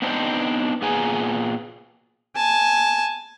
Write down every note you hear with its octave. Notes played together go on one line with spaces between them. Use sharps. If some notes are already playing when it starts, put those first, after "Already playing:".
B3 C4 D4 D#4 C5
A#2 B3 G#4 G#5 A#5
G#5 A5